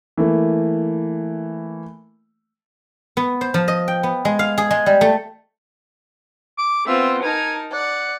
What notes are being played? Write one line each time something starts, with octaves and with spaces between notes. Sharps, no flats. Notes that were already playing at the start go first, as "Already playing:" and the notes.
E3 A3 A#3
B3
C5
F3
D#5
G5
B3
G#3
F5
G#4
G#3
G3
A3
D6
B3 C4 F4 E5
D#4 A#4 G#5 A5
D5 F#5